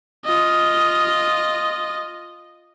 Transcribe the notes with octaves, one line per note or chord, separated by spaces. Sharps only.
F4 D#5